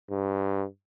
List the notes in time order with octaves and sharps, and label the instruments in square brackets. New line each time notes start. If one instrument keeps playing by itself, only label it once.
[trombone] G2